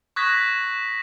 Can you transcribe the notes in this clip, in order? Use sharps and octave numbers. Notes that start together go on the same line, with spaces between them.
C#6 D#6 F#6 G#6 A#6 B6